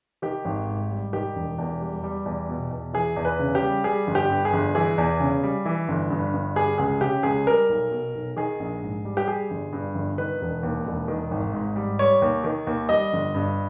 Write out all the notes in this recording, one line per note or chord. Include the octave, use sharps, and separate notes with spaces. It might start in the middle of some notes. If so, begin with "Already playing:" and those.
D#3 G4
G#1
G#2
G3
D#3 G4
E1
E2
G3
G3
E2
B2
E2
E3 G#4
E2
B4
C#3
G4
G3
G3 G#4
G1
G4
G2
G#4
G1
E3 G#4
E2
C#3
G3
E3
G1
G2
G1
G3 G#4
C#2 G#4
C#3 G4
C#2 G#4
G3 A#4
B1
B2
B1
D#3 G#4
A#1
G#2
G3
G4
G3 G#4
G1
G2
G1
D#3 B4
E1
D#2
E1
D#3
G#1
G#2
G3
G3 C#5
D#2
D#3
D#2
G3 D#5
G1
G2